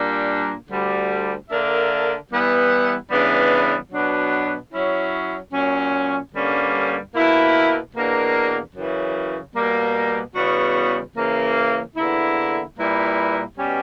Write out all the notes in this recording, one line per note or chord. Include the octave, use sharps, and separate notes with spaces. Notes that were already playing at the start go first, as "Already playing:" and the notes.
Already playing: A#2 G3 A#3 D4
D2 D3 G3
D3 A#3 D4 A#4 E5
E3 G3 B3 E4
C#3 E3 G3 B3 D4
B2 F#3 B3 D4
F#3 C#4 E4
A#2 F#3 C#4
G2 D3 G3 A#3 C#4
B2 A#3 E4 A#4
E2 B2 A#3 D4 A#4
F#2 C#3 E3
B2 G3 A#3
E2 C#3 G3 B3 F#4
C#3 E3 A#3
E2 D3 A#3 E4
A#2 G3 A#3 E4 B4
B2 G3 C#4 G4